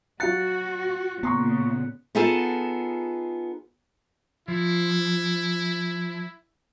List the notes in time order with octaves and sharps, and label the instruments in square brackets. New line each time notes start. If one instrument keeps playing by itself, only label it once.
[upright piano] F#3 F5 A6 [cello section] F#4 [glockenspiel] F#6 C#7
[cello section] A#2 C#3 [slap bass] B3 [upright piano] A#5 C6 C#6
[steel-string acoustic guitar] B3 D#4 F4 G#4 A4 A5
[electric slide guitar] F3 [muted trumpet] E4